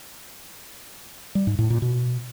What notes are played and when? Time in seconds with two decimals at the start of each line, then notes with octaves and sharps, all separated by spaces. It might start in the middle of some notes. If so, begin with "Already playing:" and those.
1.35 G3
1.47 G#2
1.59 A2
1.70 A#2
1.82 B2